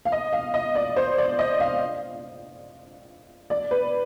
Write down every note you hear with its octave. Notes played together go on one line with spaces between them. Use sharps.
F5
D#5
F5
D#5
D5
C5
D5
D#5
F5
D5
B4